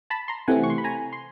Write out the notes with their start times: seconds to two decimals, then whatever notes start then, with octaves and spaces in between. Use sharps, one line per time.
0.10 A5 B5
0.28 A#5 C6
0.48 C3 E3 A3 C4 F#5 G#5
0.64 C#6
0.70 C6
0.78 B5
0.84 G#5 A#5
1.13 C6